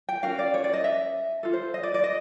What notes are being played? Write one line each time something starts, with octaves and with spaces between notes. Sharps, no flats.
G5
C#4 F#4 A#4 F5
D5
C#5
D5
D#5
E5
F4 A4
C5
D#5
D5
D5
D#5